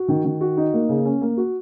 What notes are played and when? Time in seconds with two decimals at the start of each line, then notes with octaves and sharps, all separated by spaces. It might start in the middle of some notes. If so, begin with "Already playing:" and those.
Already playing: F#4
0.08 D#3
0.25 D#3
0.41 F#4
0.57 D#4
0.73 A#3
0.89 C#3
1.05 C#4
1.21 A#3
1.37 F#4